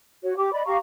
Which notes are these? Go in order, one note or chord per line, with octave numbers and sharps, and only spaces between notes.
F#4 C#5
G4 D6
D5 D#5 B5
G4 F5 A#5 C#6